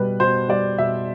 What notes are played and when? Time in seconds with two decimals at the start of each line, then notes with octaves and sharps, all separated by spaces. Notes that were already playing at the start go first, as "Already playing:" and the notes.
Already playing: B2 G3 B4
0.20 B2 C5
0.49 G3 D5
0.78 B2 E5